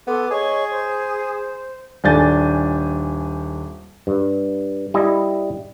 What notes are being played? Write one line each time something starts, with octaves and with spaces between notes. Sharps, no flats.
B3 A4 C6 D6
G#4 C#5 D#5 C#6
C5
D#1 D4 G#5 G6 A6
G2
G3 E4 D#5